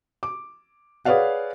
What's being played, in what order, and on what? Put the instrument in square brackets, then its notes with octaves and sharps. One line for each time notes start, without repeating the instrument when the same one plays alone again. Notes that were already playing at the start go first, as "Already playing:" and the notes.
[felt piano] D6
G#4 B4 C#5 D5 F5 F#5